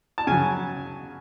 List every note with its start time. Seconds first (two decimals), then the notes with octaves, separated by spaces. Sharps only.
0.18 A5
0.27 C#3 F#3 G#5